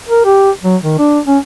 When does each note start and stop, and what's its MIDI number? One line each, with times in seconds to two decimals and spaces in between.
0.09 0.25 70
0.25 0.51 67
0.64 0.77 54
0.83 0.98 51
0.99 1.20 62
1.27 1.39 61